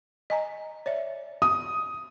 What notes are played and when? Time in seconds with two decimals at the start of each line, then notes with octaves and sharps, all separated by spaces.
0.30 D#5 G#5 A#5
0.86 C#5 D5 E5
1.42 D#6